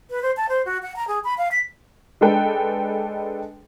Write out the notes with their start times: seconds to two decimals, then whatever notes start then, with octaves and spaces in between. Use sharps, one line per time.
0.10 B4
0.22 C5
0.37 A5
0.49 C5
0.65 F#4
0.83 F#5
0.96 A#5
1.08 G#4
1.24 B5
1.38 F5
1.52 B6
2.21 G#3 D4 G#4 A4 B4 G5